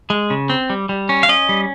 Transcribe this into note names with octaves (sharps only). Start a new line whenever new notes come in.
G#3
C#3
C4
G3
G3
C#4
F5
C#4 D#5
G3